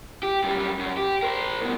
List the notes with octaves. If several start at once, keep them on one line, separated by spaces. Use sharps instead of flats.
G4
F#2 G3
F#2
G4
A#4 C5
G2 B2